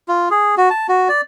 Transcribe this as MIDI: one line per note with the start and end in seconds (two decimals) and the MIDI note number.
0.08 0.29 65
0.31 0.55 68
0.58 0.69 66
0.70 0.87 81
0.89 1.08 66
1.09 1.21 74